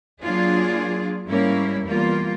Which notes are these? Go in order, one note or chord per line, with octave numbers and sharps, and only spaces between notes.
F#3 A#3 D4 F4 G#4
G#2 G3 A#3 C#4 E4
E2 G3 A#3 F4